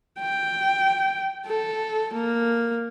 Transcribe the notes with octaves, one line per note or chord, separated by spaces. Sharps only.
G5
A4
A#3